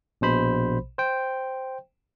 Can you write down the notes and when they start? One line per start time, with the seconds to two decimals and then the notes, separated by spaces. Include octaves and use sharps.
0.21 A#1 B2 C5 B5
0.98 C5 G5